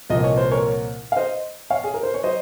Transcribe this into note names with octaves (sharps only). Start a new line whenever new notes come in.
C2 A#2 F3 A#3 D#5
C#5
C5
A#4 C#5
F5
C5 D#5
C#5 F5
G#4
A#4
C5
C#5
F#3 C5 D#5